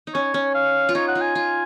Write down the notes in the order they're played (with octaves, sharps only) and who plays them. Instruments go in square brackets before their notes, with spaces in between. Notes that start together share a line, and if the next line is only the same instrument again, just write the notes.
[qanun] D#4
[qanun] C#4 [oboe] C#5
[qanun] C#4
[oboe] F5
[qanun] F4
[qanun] D#4 [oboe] C#5
[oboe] F#5
[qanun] F4
[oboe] G#5
[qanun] F4